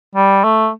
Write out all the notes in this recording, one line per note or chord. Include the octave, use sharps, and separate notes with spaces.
G3
A3